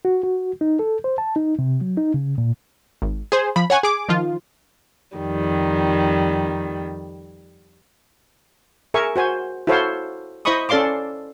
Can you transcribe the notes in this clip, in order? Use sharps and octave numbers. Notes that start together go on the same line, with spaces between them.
F#4
F#4
D#4
A4
C5
A5
D#4
C3
F#3
D#4
C#3
A#2
G#1
G#4 C5
F3 B5
C#5 F#5 G#5
G#4 D6
D#3 F3 F4
F2 D#3 G3
G#4 A#4 E5 G#5 C#6
F#4 C5 G#5
E4 F#4 A4 C5 C#5 F5
E4 C5 D#5 B5 C#6 D#6
C#4 A4 D5 F5 C6 D6